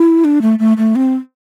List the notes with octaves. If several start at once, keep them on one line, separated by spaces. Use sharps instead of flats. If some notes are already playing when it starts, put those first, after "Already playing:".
Already playing: E4
D4
A3
A3
A3
C4